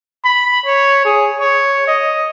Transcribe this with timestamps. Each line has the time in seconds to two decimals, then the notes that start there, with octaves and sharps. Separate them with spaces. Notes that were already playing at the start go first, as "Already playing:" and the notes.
0.24 B5
0.66 C#5
1.05 G#4
1.40 C#5
1.87 D#5